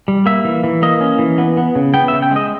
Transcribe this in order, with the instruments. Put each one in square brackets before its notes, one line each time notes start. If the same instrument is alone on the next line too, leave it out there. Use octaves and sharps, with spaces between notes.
[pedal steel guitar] G3
A#3 E5
E3
E3
A#3 D#5
C#4
E3
B3
B3
C#3
B3 G5
C#3 E5
G5
G#3 D#5